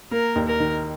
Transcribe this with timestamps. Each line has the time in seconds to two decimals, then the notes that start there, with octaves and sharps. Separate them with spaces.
0.11 A#3 A#4
0.35 D#2
0.47 A#4
0.60 D#3